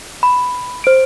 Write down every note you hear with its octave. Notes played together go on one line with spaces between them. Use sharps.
B5
C5 D7